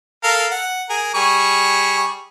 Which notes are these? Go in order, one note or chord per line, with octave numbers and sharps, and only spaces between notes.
A4 A#4 F5
F#5
G#4 A#4
G3 G#4 C#6